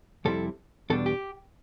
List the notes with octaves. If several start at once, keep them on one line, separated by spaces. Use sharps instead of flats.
F2 C3 G3 C4 E4 A4
E2 B2 G3 D4 A4
G4